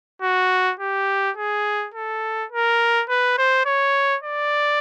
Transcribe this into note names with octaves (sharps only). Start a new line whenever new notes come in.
F#4
G4
G#4
A4
A#4
B4
C5
C#5
D5